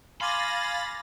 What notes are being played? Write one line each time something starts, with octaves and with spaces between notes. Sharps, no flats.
F5 G#5 B5 C6 D6 A6 A#6 D#7